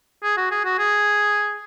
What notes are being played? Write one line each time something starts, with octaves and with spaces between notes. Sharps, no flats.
G#4
F#4
G#4
F#4
G#4